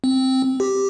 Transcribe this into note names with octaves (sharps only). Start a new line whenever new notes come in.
C4
G4